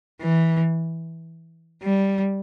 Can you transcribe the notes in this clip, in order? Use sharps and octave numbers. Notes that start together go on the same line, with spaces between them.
E3
G3